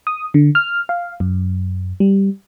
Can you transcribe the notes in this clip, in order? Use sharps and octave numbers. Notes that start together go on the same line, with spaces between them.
D#6
D3
F6
F5
F#2
G3